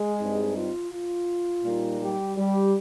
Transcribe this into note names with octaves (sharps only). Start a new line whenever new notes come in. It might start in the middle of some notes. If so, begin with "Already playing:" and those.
Already playing: G#3 G#4
G2 G3 C4 D#4
F4
F4
A#2 G3 A#3 D#4
G3 G4
G3 G4